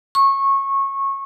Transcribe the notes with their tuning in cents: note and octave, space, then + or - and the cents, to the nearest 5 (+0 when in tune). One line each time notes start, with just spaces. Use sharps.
C#6 -20